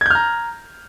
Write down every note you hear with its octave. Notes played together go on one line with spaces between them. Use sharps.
A#5 F6 G6 G#6